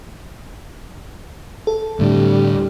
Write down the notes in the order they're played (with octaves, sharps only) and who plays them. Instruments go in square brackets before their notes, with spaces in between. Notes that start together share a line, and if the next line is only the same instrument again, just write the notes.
[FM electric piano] A4
[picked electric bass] D2 A2 D3 [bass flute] G3